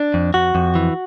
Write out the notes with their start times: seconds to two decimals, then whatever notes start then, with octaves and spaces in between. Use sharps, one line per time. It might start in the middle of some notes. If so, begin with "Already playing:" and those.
Already playing: D4
0.14 F2
0.34 F2 F#4
0.55 F2
0.75 E3